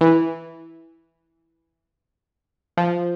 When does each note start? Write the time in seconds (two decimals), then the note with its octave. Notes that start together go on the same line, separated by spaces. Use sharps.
0.01 E3
2.77 F3